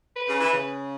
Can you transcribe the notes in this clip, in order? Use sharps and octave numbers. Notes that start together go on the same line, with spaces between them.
B4
C#3
E3
C#3